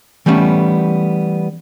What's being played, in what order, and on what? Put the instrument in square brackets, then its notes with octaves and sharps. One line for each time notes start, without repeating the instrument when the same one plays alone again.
[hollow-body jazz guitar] E3 G3 A3 B3 C#4